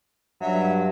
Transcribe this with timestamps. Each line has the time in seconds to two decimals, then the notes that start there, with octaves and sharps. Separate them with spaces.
0.41 G2 F#3 E5